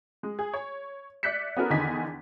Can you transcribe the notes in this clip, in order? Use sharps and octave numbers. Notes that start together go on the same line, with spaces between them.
G#3
G#4
C#5
D5 E5 F#6 G6 B6 C#7
B3 C#4 E4 F#4 A4 A#4
E2 D3 D#3 D#5 G#5 B6